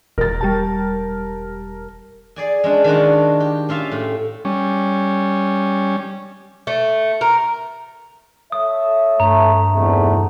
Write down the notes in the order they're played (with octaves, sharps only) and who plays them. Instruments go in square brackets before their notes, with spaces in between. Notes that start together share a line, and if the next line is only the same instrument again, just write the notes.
[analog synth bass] E1 [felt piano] A#4 A6
[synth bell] G3 G4 A5
[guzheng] G#4 D5 G#5
G#3 C#4 D4
D#3 D4 F4 F#4
G4
C#4 F4 E5 F5
A2
[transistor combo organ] G3 C#4
[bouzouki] A3
A#4
[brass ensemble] A4 C#5 E5 [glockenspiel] D#6
[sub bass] G2 [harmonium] A3 [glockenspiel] A#5
[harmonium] E2 A3 [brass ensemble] G#2 C3